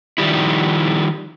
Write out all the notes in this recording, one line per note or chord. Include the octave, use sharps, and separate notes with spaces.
D#3 F3 G3 E4